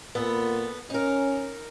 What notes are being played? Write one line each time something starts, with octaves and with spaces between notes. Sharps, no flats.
A#2 B3 A4
C#4 D#4 A#4